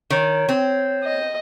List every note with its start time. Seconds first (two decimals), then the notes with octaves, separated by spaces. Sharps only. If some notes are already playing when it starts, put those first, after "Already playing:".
0.10 D#3 C#5
0.49 C4
1.04 D#5